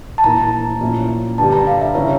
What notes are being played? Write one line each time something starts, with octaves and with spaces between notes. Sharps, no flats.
A5
A#1 A2 E3 A#3 A#5
A#2 F3 C#4 E4
G2 D3 G3 A5
A#5
F5
E5
C#3 E3 C#5